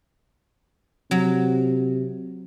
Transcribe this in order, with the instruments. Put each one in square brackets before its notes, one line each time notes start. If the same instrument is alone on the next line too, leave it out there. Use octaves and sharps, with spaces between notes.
[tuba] C3 [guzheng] F#3